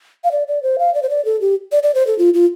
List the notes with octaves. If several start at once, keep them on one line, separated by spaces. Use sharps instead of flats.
F5
D5
D5
C5
F5
D5
C5
D5
A4
G4
D5
D5
C5
A4
F4
F4